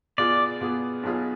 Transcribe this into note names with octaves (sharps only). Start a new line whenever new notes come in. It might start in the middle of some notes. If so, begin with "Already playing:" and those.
B2 B3 F4 G#4 D5
B2 B3 F4 G#4
B1 B2 B3 F4 G#4